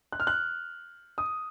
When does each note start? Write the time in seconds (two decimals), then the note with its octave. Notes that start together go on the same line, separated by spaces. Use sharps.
0.13 F#6
0.20 F6
0.27 F#6
1.18 D#6